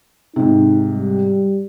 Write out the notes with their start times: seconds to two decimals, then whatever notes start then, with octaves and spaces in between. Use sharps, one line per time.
0.36 G#2 C3 D#4
0.91 G3